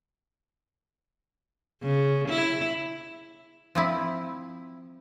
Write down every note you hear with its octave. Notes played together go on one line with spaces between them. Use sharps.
C#3
E4
F3 C4 E4